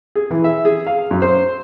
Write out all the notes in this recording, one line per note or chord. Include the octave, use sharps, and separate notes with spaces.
G#4
E3
E5
G#4
F5
F#2
C5